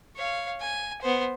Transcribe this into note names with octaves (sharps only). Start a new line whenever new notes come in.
C#5 F5
G#5
B3 C5